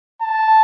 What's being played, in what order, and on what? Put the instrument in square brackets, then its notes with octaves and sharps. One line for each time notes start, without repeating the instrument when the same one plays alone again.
[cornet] A5